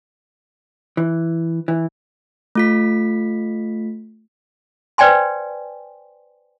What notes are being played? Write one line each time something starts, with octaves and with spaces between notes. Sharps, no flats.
E3
E3
A3 F4 B6
B4 C5 D5 G5 G#5 C6